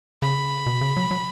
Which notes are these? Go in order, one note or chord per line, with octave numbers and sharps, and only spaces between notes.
C#3 B5
B2
C#3
F#3
F#3